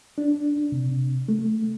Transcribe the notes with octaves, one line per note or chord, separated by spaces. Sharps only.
D4
C3
A3